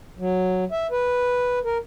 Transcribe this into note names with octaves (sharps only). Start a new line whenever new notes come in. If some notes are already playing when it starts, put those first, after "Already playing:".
F#3
E5
B4
A#4